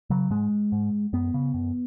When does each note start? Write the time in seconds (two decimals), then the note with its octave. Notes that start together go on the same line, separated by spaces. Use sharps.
0.10 C#3 F#3
0.30 G#2 G#3
0.72 G#2
1.13 F#2 B3
1.34 C#3
1.54 F#2